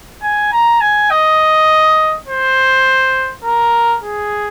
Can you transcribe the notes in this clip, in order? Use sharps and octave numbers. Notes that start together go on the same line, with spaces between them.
G#5
A#5
G#5
D#5
C5
A#4
G#4